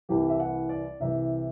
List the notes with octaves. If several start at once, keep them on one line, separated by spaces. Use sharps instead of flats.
C2 C3 E3 G4
E5
F#5
D5
C2 C3 E3 E5